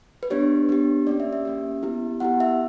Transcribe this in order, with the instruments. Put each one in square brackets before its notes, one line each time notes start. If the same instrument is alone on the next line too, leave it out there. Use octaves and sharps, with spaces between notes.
[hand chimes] B4
B3 D4 G4 C#5
B3 D4 G4
A#3 C#4 G4 D5
E5
E5
A#3 C#4 G4
B3 E4 G4
B3 E4 G4 F#5
E5